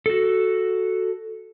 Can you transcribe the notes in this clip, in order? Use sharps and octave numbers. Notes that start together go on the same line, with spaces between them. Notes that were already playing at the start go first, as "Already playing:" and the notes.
F#4 A4